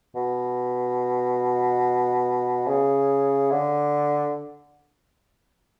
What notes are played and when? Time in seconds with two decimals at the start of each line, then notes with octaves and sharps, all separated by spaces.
0.15 B2
2.68 C#3
3.51 D3